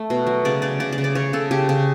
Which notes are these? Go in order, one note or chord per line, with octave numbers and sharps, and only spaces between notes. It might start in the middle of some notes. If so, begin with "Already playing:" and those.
Already playing: A3
B2
F#3
C#3 D5
C#3 D5
C#3 D5
D5
C#3
D5
C#3 C#5
C#3 A4
C#3 G4
C#3